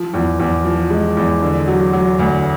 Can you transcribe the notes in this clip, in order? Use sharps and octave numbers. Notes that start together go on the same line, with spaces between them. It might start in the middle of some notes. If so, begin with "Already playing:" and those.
Already playing: F3
E2
E2
F3
G#3
E2
D3
F#3
F#3
D2